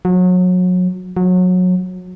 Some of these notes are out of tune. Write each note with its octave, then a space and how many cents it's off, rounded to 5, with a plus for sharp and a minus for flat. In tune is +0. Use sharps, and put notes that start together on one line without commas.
F#3 -30
F#3 -25